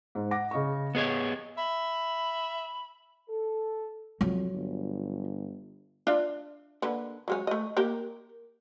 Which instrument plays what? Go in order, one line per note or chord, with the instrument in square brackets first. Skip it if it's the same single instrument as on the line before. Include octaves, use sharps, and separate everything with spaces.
[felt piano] G#2
F#5 D6 A#6
C#3 D#5 C#6
[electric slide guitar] B3 G#4 C#5 [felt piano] D#5
[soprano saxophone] E5 [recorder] B5
[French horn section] A4
[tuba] F2 [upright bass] F#3 F4
[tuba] G1
[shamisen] D4 F4 E5
D3 A#3 B4
F#3 G#3 C#4
A3 D#5
A#3 G4 A#4